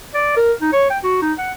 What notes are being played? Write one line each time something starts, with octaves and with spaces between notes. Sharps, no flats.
D5
A#4
D#4
C#5
G5
F#4
D#4
F#5